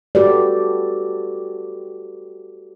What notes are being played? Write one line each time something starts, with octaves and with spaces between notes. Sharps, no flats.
F#4 G4 A4 B4 D5